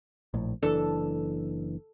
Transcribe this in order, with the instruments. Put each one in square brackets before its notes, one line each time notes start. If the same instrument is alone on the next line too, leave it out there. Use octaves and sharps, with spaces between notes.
[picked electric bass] A#1 A2
[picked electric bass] F#1 E3 D4 [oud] A4